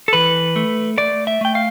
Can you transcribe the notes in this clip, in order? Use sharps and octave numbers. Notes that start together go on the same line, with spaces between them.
A4
E3 B4
A3
A3 D5
E5
A3 G5
F5